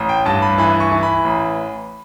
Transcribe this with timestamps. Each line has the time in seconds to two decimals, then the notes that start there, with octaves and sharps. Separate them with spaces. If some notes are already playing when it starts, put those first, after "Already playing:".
Already playing: A1
0.09 G5
0.25 G2 A5
0.42 B5
0.58 E3 B5
0.80 C#6
0.92 E3
1.03 B5
1.25 A1